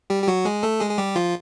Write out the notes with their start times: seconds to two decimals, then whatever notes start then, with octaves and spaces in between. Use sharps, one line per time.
0.10 G3 G4
0.23 G4
0.28 F#3 F#4
0.45 G#3 G#4
0.63 A3 A4
0.81 G#3 G#4
0.91 G#4
0.98 G3 G4
1.16 F3 F4